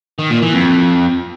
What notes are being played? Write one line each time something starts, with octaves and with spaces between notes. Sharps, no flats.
D#3
A#2
E3
F2